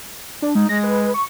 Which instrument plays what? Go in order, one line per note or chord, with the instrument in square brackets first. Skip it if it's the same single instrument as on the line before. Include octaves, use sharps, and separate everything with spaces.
[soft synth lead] D4
[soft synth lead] G#3 [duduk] D#4
[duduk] G#3 [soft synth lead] A#6
[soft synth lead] B4
C#6